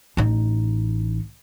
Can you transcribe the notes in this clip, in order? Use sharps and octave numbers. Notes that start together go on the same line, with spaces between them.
A1 D#4